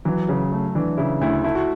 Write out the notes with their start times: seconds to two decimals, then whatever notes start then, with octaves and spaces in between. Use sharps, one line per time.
0.05 E3 F#3
0.29 C#3
0.52 A3
0.75 E3 D4
0.97 C#3 E4
1.21 D2 E4
1.44 A3 E4
1.55 F#4